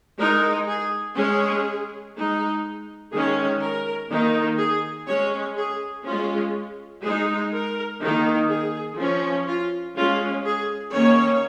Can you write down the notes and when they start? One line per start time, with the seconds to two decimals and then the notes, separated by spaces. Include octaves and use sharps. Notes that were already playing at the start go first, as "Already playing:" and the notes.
0.18 G#3 D#4 A#4
0.67 G#4
1.16 G#3 C#4 G#4
2.15 G#3 D#4
3.12 D#3 G#3 C#4 G#4
3.61 A#4
4.10 D#3 A#3 D#4
4.58 G#4
5.07 G#3 C#4 C#5
5.57 G#4
6.05 G#3 C#4 F4
7.03 G#3 D#4 G#4
7.52 A#4
8.00 D#3 A#3 D#4
8.49 G#4
8.98 F3 C#4
9.48 F4
9.96 G#3 C#4 F4
10.45 G#4
10.94 D#3 A#3 C#4 C#5